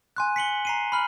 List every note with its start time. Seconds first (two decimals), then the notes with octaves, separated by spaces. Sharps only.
0.16 G#5 C6 F#6
0.36 B6 C#7 F#7 G7
0.65 A#5 C7 D#7
0.92 B5 F6 F#7